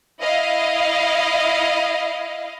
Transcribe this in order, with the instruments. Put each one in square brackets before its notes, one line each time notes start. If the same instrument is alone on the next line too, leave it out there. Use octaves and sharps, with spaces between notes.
[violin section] E4 D#5 F5